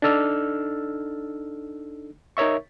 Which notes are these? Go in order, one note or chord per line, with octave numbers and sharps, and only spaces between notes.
D4 D#4 A4 E6 F6
D#4 A#4 C#5 E5 C#6